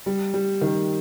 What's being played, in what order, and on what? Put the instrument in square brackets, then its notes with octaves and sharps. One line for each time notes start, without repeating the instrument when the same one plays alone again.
[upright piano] G3
G3
D#3